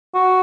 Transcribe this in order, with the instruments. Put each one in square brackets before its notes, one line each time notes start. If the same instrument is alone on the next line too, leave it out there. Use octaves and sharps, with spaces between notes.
[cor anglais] F#4